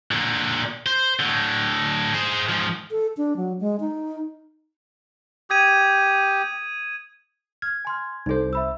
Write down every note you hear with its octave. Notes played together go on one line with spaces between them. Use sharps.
A#2 D3
C5
A2 D3
G#4 C5
G#2 F3
A4
D4
F#3
G#3
D#4
G4 D#6 G#6 D#7
F6 G#6
G#5 C6 F6
C2 D#4 A4 C5
E5 B5 E6